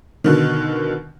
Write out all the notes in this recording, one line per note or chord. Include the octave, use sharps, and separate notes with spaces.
B2 D3 D#3